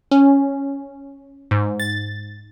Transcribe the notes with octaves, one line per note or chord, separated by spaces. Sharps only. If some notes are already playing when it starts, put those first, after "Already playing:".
C#4
G#2
A6